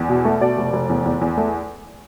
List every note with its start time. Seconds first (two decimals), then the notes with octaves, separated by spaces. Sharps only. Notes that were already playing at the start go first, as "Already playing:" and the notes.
Already playing: E2
0.09 B2
0.25 A3
0.41 B2 D5
0.58 F1
0.73 F1
0.90 E2
1.06 E2
1.21 E2
1.37 A3